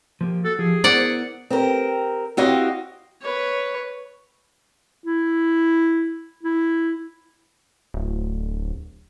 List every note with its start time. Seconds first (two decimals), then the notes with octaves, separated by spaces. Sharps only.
0.21 F3 A#3 G4
0.45 F#4 A4
0.59 F3 G4 G#4
0.84 B3 E4 A#4 C5 D5 F#5
1.50 C4 G4 A#4
2.37 C4 E4 F#4 G4 D#5 F5
3.22 B4 C#5
5.04 E4
6.43 E4
7.94 D1